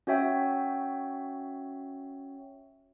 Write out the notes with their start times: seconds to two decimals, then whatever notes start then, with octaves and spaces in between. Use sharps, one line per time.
0.07 C#4 F#4 C#5 E5 G5